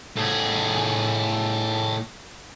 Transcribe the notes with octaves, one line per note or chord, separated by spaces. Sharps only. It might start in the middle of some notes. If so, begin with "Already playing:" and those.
A2 G#4